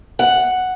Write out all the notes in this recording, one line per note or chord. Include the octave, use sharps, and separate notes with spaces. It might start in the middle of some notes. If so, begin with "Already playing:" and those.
F#5